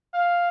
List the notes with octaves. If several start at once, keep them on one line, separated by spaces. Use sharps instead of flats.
F5